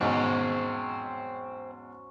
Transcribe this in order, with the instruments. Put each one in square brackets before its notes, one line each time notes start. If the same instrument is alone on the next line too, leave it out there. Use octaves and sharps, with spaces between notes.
[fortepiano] E2 G#2 B2 [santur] F#3 C#4 C5 [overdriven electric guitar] C4 G#4